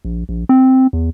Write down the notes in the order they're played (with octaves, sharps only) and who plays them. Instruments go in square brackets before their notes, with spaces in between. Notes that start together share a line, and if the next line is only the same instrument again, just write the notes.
[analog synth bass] A#1
A#1
C4
E2